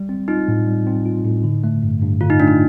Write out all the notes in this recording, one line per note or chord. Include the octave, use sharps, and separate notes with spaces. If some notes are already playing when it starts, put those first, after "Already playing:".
Already playing: G3
C4
D#4 F4
A2
G3
C4
F4
A2
D3
A3
G2
G2
D3 F4
D#4
A3 D4
D#4